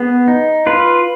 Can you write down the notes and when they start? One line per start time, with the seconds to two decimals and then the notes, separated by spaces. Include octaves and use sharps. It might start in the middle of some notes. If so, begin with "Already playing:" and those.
Already playing: B3 G#4
0.28 D#4
0.66 F4 B4